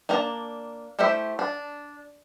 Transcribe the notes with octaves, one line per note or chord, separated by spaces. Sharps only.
A#3 D4 A5 A#5
A3 E4 G4 C5 E5
D4